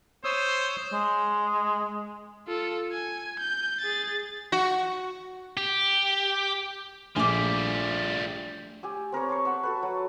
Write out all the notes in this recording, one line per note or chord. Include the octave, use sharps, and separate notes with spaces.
C5 C#5 D#6 E6
G#3
F4 A4
G#5
G6
G#4 A6
F#4
G4
A#1 F3 G3 A3 G#5 D6
G4 G#5 E6
C4 A#4 B4 C#5
A5 C6 C#6
E5 F#5 C#6
F#4 A4 B4
F#3